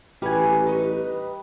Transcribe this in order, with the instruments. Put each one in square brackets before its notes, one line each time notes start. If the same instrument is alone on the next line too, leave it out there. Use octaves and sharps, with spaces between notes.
[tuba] A1 [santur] G3 [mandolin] C#4 G#5 [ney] B4
[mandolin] D#4 D#5 C#6